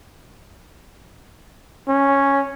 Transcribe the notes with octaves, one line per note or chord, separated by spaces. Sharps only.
C#4